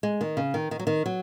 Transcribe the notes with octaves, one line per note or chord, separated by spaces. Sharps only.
G#3
D#3
C#3
D#3
D#3
F#3
D#3
F#3